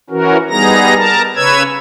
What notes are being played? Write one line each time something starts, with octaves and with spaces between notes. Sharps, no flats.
E3 C#4 F#4 A#4
G3 B3 D#4 G#4 A#5 A#6
A#4 A5 A#5
C#3 B4 C#5 E6 G#6